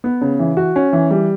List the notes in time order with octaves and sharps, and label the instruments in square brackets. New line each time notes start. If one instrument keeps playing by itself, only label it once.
[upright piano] B3
C#3
E3
F#4
C#4
E3
G3